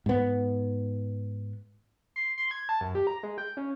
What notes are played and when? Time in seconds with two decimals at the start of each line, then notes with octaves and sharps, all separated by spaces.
0.06 G#2 B3
2.16 C6
2.38 C6
2.51 G#6
2.69 A5
2.81 F#2
2.95 G4
3.07 A#5
3.23 G#3
3.38 G5
3.57 C#3